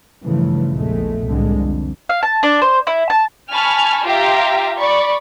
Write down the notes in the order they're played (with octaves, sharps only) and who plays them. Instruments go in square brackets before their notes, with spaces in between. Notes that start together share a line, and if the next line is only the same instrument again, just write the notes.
[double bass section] G2 C#3 E3 F3 A3
A#1 E2 G#3 A3
C2 A2 D3 G#3
F2
[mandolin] F5
A5
D4
C5
E4
A5
[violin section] G#5 A5 B5 C#6 F6
F4 G4 E5 F5 G5 A#5
D5 B5 C#6